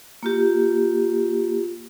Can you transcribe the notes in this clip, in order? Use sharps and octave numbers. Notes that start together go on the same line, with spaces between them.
A#3 F4 G4